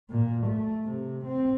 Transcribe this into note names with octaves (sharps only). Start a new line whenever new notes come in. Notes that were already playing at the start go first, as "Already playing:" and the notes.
A#2
A3
C3
C4